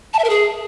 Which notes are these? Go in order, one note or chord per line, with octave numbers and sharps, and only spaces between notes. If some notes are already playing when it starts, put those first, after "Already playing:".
A5
E5
A#4
G#4